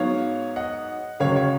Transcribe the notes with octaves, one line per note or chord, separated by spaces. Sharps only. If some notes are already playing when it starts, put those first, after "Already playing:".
Already playing: G#2 F#3 B3 C#5 F5
D#5 F#5
C#2 C#3 F#3 C#5 F5
C#5